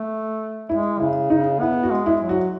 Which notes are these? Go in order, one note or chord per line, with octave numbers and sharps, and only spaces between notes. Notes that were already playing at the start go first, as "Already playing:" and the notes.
Already playing: A3
G#3 E4
C#3 E4
C#3 D#4
B3 E4
F#4
G#3
E4
F#3
F#4